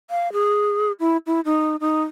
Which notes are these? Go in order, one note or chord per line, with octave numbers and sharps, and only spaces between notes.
F5
G#4
E4
E4
D#4
D#4